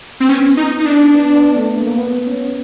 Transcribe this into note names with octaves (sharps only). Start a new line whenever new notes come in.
C4
B3 C#4
D#4
D#4
D4
B3
B3
A3
A#3
A#3
B3
C#4